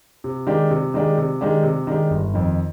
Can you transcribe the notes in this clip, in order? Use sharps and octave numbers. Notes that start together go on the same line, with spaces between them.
C3
D#3 G#3 D4 G4
C3
D#3 G#3 D4 G4
C3
D#3 G#3 D4 G4
C3
D#3 G#3 D4 G4
G1
F2 D#3